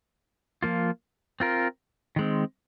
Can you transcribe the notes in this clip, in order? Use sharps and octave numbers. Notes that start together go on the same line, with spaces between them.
F3 A#3 F4
C4 F4 A#4
D#3 G#3 C4